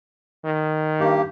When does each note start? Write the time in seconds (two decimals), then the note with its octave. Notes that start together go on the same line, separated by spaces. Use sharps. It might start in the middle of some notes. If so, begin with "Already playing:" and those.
0.44 D#3
1.00 G2 A#3 G4